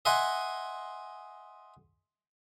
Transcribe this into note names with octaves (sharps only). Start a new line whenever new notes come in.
D#5 E5 F#5 G#5 C6